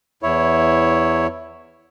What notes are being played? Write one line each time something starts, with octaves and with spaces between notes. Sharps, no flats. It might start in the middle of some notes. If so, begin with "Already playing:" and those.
E2 E4 C#5